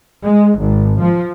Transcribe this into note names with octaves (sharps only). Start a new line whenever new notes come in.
G#3
G#1
F3